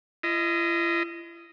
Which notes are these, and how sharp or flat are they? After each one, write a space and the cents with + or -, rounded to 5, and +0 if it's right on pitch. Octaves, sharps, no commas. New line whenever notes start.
E4 +45 D#5 +0